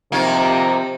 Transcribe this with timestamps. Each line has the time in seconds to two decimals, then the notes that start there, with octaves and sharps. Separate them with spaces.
0.12 C3 D#3 F3 A#3